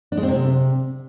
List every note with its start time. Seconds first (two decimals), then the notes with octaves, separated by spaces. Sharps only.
0.12 D4
0.17 G#3
0.23 C4
0.28 C3